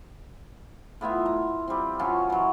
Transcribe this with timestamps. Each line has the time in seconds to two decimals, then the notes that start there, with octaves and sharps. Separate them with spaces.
1.01 A2 B3 F4 E5
1.26 A#5
1.68 G3 C4
1.99 D#3 F#3 C#4 F4
2.30 E3 F#3